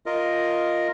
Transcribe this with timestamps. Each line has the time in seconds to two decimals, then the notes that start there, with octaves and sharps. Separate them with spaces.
0.06 F4 A#4 D#5